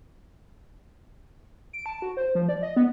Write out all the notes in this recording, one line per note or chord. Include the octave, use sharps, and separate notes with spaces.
D7
A5
F#4
C5
F3
D5
D#5
B3